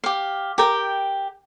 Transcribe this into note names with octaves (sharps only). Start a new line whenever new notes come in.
G4 F5
G4 A#4 G5